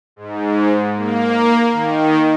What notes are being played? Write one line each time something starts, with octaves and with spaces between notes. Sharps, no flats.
G#2
A#3
D#3